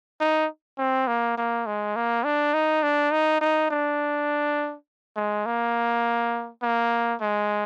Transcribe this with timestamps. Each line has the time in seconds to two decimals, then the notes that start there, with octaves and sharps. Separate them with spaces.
0.21 D#4
0.78 C4
1.07 A#3
1.38 A#3
1.66 G#3
1.96 A#3
2.25 D4
2.54 D#4
2.83 D4
3.12 D#4
3.41 D#4
3.71 D4
5.16 G#3
5.46 A#3
6.62 A#3
7.21 G#3